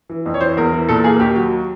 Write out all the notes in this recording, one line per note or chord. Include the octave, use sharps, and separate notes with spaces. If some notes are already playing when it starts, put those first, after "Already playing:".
E3
F2
C#5
E3 C5
E2 A#4
E3
A#2 A4
A#3 G#4
D#2 G4
F#3